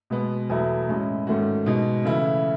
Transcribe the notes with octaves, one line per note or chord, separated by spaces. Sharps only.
B2 G#3 B3
E2 B2 F#3 A3 E4
A2 G#3 C#4 E4
G#2 D#3 A3 C#4 F#4
B2 G#3 D#4
C#3 E3 A3 E4